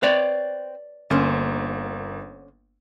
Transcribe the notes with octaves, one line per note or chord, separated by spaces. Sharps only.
C4 B4 C#5 D5
G1 D3 A#3 C#4 C5